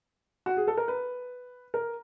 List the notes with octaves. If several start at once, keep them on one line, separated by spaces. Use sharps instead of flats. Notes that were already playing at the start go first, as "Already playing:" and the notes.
F#4
G#4
A4
A#4
B4
A#4